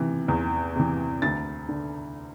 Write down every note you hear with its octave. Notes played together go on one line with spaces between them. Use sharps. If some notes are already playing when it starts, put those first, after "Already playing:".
Already playing: C3 E3
E2
C3 E3
D2 A6
D3